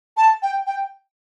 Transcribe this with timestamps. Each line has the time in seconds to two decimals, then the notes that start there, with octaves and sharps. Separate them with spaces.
0.17 A5
0.42 G5
0.67 G5